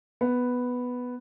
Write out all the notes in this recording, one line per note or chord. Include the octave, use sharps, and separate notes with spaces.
B3